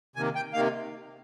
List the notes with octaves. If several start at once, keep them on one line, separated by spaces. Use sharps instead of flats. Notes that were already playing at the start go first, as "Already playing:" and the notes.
C3 D#3 A#3 G#5
G5
C3 D#3 A#3 F5